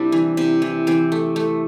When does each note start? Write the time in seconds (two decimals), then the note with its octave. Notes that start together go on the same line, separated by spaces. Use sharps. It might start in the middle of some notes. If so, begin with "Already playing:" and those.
Already playing: C3 G3 D4 E4
0.12 E3
0.37 C3
0.62 E3
0.87 E3 C4
1.12 A3
1.36 A3